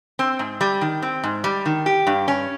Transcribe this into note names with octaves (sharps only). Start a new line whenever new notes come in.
C4
G#2
G3
D#3
C4
G#2
G3
D#3
G4
G2
C#4